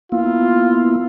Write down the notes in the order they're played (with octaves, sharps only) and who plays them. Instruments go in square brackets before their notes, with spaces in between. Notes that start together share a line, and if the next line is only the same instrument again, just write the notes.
[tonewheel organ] A#3 B3 E4 [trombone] F4